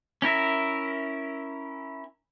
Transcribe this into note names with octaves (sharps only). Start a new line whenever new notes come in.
C#4 E4 A#4 E5